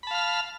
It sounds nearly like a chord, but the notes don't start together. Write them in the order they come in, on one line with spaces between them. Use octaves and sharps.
B5 A5 F5 F6